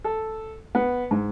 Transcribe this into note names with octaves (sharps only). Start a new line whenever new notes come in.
A4
B3
G#2